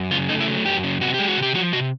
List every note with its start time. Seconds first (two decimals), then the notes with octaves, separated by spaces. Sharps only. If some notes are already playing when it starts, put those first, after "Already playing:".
Already playing: F#2
0.11 C#3 F4
0.29 A3 D#4
0.41 E4
0.48 F#3
0.65 F#2 G4
0.83 C#3
1.01 C3 F#4
1.14 G#3 G4
1.28 F#4
1.37 C3
1.42 G4
1.54 F3 F#4
1.73 C3 F#4